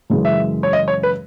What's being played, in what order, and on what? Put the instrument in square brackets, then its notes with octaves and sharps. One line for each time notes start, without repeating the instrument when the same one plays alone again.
[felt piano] F#2 C#3 E3 G#3
[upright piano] E5
C#5
D#5
C#5
B4